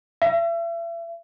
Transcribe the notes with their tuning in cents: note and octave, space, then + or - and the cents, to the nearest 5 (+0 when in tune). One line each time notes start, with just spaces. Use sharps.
E5 +40